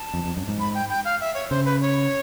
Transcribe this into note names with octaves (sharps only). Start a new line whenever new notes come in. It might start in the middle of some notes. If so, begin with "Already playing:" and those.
Already playing: A5
F2
F2
F#2
G#2
B5
G5
G5
F5
E5
C#5
C#3 C5
B4
C#5